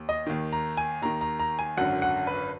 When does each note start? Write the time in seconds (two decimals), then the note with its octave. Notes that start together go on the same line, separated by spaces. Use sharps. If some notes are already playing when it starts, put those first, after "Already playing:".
Already playing: D#2
0.09 D#5
0.27 D#2 D#3
0.53 A#5
0.77 G#5
1.02 D#2 D#3 A#5
1.21 A#5
1.40 A#5
1.59 G#5
1.77 G#1 F#2 D3 F#5
2.02 F#5
2.27 B4